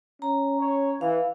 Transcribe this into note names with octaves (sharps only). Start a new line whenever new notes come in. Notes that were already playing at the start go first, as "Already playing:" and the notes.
C#4 A#5
C#5
E3 F5